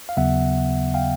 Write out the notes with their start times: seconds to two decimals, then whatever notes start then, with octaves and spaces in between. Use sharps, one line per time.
0.09 F5
0.17 D#2 C#3 F#3 B3 E5 F#5
0.94 F5 G5